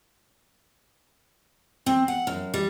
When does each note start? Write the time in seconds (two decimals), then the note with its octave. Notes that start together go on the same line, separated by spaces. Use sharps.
1.86 C4
2.08 F#5
2.27 F#2
2.54 G3